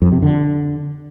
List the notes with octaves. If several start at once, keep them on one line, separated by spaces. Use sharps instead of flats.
F2
C3
D3